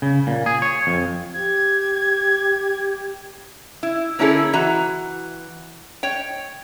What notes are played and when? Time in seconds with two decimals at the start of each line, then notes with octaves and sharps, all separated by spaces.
0.02 C#3
0.27 A#2
0.46 G#4
0.62 C#5
0.87 F2
1.33 G4 G#6
3.83 E4
4.19 D3 A#3 C#4 E4 G#4 A4
4.53 E3 F#4 A#5
6.03 C#5 G5